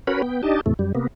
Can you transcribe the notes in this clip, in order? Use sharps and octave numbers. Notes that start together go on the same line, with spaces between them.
C#4 F#4 A#4 B4 C#5 B5
B3 G5
D4 D#4 G4 D#5 A5
E2 A2 C3 A3
F#2 G3
C3 A#3 B3